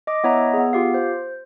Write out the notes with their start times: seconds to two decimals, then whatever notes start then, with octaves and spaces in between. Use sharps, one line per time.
0.07 D#5 D6
0.24 B3 E4 C#5 D#5 E5 A#5
0.53 B3 G#4
0.73 F4 G4 F5
0.94 C5